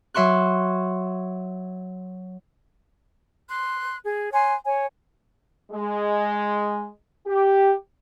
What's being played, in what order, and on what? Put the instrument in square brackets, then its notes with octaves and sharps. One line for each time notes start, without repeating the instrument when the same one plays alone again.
[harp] F#3 E5 C6 C#6 F#6
[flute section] C6 F#6
G#4
C#5 G#5 C6 F#6
C#5 G#5
[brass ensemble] G#3
G4